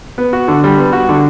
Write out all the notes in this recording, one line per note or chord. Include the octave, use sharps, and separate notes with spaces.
B3
F#4
D3
G3
B3
F#4
D3